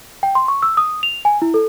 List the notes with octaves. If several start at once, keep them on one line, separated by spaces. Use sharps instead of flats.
G5
C6
C#6
E6
D#6
F7
G#5
E4
A4